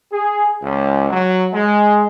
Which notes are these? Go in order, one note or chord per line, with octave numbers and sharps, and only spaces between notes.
G#4
C#2
F#3
G#3